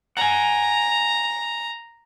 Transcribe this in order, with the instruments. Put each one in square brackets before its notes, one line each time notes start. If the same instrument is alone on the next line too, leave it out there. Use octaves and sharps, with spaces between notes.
[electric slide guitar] F#5 G#5 [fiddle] A#5